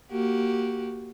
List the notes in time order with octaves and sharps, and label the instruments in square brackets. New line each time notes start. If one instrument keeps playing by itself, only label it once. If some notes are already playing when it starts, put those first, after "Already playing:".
[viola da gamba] A#3 F#4 G4